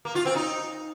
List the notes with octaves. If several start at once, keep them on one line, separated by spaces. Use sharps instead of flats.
A#3
F4
C4
D#4